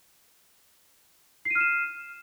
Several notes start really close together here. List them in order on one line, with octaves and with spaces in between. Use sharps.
C7 D#7 F6 E7